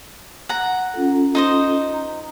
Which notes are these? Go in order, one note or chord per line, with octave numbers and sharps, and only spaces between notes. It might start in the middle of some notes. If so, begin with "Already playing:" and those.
F#5 A#5
C#4 F4 A4
D#4 C5 D#5
A#5